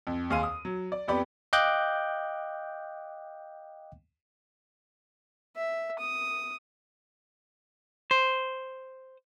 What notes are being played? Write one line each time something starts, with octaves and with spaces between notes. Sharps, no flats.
F2
D#2 G#4 F5 C6 D#7
D#6
F#3
D5
F2 B3 G4 D5 B5
D#5 F5 G5 D6 F#6 G6
E5
D#6
C5